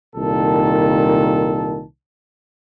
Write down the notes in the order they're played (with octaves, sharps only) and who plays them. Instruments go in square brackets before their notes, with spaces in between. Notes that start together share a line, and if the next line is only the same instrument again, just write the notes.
[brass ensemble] C2 A#2 D#3 A4 A5